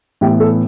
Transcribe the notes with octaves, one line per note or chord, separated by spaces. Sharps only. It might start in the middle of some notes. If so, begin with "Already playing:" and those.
A2 E3 B3 G4
A4